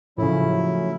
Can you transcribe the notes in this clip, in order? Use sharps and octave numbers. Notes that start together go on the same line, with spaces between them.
A2 C#3 F3 F#3 C#4 E4